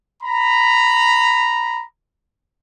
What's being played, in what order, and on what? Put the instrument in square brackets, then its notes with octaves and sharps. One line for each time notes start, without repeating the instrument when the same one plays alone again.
[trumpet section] A#5 B5